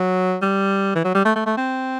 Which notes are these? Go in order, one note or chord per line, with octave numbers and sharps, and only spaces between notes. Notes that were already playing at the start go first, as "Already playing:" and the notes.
Already playing: F#3
G3
E3
F#3
G3
A3
A3
A3
C4